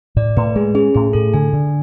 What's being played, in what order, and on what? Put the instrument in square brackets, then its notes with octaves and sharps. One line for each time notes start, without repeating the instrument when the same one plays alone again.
[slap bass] A2 [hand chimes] D5
[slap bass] A2 [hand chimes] B4
[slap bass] G#3 [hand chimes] G#4
[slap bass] C#4 [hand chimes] G#4
[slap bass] A2 [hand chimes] G#4
[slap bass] A2 [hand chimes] A4
[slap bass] D3 [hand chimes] G#5
[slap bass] D3